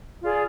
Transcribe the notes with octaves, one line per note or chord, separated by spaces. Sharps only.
F4 G#4 D5